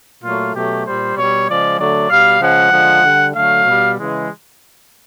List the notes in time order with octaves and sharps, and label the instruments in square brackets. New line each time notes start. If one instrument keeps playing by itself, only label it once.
[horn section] A#2 F#3 A3 F4
B2 F#3 A3 G4
A#2 G3 C5
B2 G3 C#5
C#3 F3 G#3 D5
D3 F#3 A3 D5
B2 G3 F5
C#3 F3 G#3 F#5
D3 F3 G#3
D3 G3
D3 F#3 A3 F5
B2 G3
C#3 E3 G#3